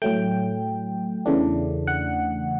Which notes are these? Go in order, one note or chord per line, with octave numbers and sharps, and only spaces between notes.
A2 F#3 A3 G5
E2 C#3 E3 A3 D4
F#5